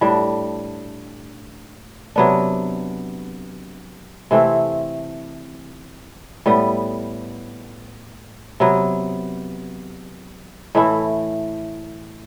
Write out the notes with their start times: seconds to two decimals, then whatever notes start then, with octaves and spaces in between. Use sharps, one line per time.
0.01 A2 G3 D4
2.16 C3 F#3 B3 D4
4.31 C3 E3 A3 C4
6.46 A2 G3 B3
8.60 C3 F#3 B3
10.75 A2 E3 A3 E4